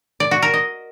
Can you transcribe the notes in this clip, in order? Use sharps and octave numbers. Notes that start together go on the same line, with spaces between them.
D5
F#4
A#4
D#5